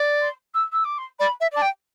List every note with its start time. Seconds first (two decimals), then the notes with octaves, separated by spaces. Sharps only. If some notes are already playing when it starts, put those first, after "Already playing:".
Already playing: D5
0.22 C6
0.54 E6
0.72 E6
0.85 D6
0.98 C6
1.20 D5 B5
1.41 E5
1.52 D5 A5
1.62 G5